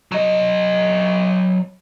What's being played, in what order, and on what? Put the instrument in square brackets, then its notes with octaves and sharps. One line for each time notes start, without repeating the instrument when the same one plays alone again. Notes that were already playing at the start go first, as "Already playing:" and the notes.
[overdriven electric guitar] F#3 D#5